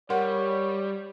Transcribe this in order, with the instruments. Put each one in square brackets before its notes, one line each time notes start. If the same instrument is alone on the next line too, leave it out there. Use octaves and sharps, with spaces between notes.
[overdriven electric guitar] G3 [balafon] A#4 F#5 C6 [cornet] C#5